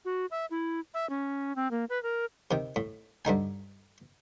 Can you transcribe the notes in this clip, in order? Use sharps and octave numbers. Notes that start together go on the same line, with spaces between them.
F#4
E5
E4
E5
C#4
C4
A#3
B4
A#4
C3 D#3
A2
G2 D3 D#4 G#5